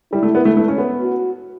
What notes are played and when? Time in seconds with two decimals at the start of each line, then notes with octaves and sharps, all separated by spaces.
0.12 G3 E4
0.23 A3
0.35 B3
0.45 A3
0.57 A3
0.68 C#4
0.78 B3
1.00 F#4